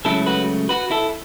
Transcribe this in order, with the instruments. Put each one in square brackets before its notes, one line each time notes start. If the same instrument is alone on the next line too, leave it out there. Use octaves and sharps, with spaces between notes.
[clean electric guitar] C#2 C#3 F#3 A3 E4 A4
F#4 B4
F#4 B4
E4 A4